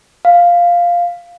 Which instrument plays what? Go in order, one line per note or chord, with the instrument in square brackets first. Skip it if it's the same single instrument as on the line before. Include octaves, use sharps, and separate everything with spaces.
[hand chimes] F5